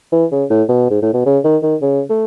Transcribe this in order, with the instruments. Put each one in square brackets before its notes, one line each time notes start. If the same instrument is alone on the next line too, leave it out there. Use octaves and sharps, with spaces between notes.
[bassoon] E3
C#3
A2
B2
G#2
A2
B2
C#3
D#3
D#3
C#3
A3